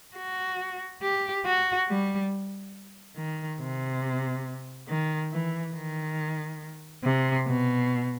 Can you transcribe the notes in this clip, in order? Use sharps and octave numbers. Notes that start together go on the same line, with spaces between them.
F#4
G4
F#4
G3
D#3
C3
D#3
E3
D#3
C3
B2